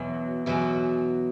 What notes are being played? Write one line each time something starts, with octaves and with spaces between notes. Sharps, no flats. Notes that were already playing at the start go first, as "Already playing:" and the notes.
Already playing: E2 B2 F#3
E2 B2 F#3